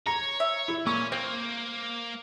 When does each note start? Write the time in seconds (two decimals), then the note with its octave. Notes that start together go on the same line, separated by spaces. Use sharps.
0.07 C#5 A#5
0.40 E5
0.68 E4
0.86 A#2 C#4 C#6
1.12 A#3 C4 C5